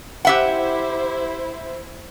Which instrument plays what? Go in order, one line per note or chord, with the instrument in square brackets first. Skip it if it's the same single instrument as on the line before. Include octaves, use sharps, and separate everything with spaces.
[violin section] E4 C5 [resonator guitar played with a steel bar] G4 E5 F#5